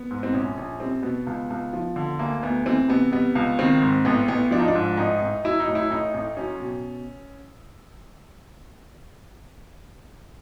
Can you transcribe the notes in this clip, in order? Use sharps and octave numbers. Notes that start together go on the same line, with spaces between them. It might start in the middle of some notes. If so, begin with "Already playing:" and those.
Already playing: B3
G#2
C4
A#1 C#4
A#1
G3 C4
B2 B3
C#2
C#2
F3
D3
D2 A#3
D2 B3
E3 C4
C3 B3
G3 B3
C#2
D#3 C4
G#2
A1 B3
A1 B3
F3 D4
D#4
D4
G#2
A1 D#4
A1
F#3 E4
D#4
A2
E4
A1 D#4
A1
F#3 C#4
B2